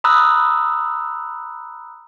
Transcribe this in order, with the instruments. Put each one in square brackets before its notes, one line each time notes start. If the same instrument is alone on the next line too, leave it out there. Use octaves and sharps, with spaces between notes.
[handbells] A#5 B5 D#6 E6 F#6